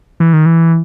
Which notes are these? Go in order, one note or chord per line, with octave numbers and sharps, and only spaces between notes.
E3
D#3
E3